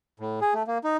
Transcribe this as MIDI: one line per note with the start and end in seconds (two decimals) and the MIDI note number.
0.20 0.40 45
0.41 0.54 68
0.54 0.63 57
0.67 0.78 58
0.84 0.97 63